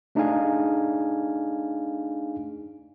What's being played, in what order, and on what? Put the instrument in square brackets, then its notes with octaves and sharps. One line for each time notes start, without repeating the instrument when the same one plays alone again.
[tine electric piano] A3 D4 D#4 G#4 F5 G#5